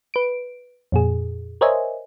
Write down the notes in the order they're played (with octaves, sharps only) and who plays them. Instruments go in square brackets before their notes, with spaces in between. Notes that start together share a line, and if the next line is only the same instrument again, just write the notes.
[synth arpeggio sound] B4 D7
F2 A#2 G#4
A#4 C5 C#5 D#5 E5 G#5